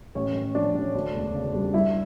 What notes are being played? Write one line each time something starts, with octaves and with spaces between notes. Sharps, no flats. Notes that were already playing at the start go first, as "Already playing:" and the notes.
A1 C#4 C#5
A1
F3 D4 D5
A1
D2
E1
C#3
G3
G2 E4 E5